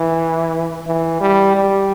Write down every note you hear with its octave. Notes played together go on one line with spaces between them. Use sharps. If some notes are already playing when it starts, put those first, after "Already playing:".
Already playing: E3
E3
G3
G3